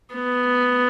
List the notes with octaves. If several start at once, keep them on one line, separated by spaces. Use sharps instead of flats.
B3